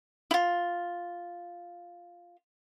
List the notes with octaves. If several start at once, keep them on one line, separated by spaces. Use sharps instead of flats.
E4 F4